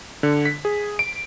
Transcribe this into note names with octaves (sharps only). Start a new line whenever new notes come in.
D3
B6
G#4
D7